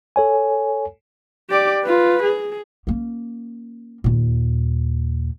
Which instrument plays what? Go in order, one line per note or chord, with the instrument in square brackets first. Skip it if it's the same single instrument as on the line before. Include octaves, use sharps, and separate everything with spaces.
[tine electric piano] A4 C#5 G#5
[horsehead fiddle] G4 D5
F4 B4
G#4
[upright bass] A#3 C#4
D#2 A#2